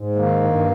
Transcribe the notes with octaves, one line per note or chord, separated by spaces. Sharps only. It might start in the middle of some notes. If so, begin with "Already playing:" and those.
Already playing: G#2
D#3 A#3
G2